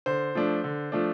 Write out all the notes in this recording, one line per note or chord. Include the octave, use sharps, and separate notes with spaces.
D3 C5
F3 A3 D4
D3
F3 A3 D4